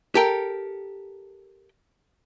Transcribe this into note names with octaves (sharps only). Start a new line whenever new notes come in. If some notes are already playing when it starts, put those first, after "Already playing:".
G4 A4 A#4 G5